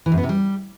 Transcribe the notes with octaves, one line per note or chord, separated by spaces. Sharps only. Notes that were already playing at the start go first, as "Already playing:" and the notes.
E3
F#2
B3
C3
G3